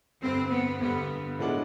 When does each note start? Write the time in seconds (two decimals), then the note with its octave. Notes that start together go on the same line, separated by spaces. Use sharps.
0.22 G2 D3 G3 C4
0.51 B3
0.80 G2 D3 G3 B3
1.39 A2 F3 G#3 B3 D4